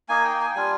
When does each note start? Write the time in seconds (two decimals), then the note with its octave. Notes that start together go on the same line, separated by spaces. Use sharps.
0.09 A#3 D#4 G#5
0.24 G5
0.40 G#5
0.50 G5
0.55 G3 D4 F4 G#5